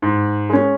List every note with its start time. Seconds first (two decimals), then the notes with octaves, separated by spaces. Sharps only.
0.02 G#2
0.50 G#3 C#4